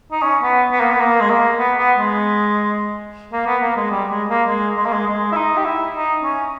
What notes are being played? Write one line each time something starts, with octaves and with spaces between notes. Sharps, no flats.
D#4
C#4
B3
B3
A#3
B3
A#3
G#3
A#3
B3
B3
G#3
A#3
B3
A#3
G#3
G3
G#3
A#3
G#3
G#3
A#3
G#3
G#3
E4
D#4
G4
E4
D#4
C#4